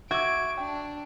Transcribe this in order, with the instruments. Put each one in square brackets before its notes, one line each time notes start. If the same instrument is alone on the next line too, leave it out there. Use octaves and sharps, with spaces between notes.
[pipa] F#4 [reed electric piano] E5 D6 E6 [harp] G#6 [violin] D7
[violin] D4 [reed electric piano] G5